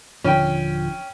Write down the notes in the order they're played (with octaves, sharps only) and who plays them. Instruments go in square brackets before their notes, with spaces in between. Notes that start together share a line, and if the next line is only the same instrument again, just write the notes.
[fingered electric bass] D#1 D3 F3 [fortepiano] C#4 G5